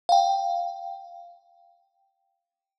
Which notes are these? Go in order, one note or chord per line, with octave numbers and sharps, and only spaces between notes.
F5 G5